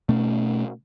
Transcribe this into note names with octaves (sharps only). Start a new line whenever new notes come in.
B2 A3 C#4